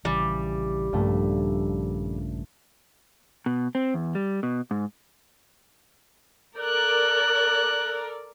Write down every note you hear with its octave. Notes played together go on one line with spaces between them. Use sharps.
A#1 C#3 E3 G3
A#1 G2 C#3 F3 A3 A#3
B2
C4
E2
G3
B2
G#2
A4 A#4 D5 F#6